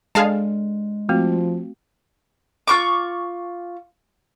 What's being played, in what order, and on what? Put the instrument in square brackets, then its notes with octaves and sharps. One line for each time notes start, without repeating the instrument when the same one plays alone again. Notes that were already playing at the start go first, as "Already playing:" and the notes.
[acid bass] G#3 [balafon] D4 A4 D5 [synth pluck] G#4 F5 A5
[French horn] F3 [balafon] A3 C4 F#4
[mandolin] F4 C#6 D6